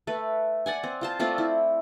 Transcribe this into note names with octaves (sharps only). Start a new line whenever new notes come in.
A3 B4
D5 F#5 G#5
C4
F4 C5 A5
A3 C4 F4 D5
E4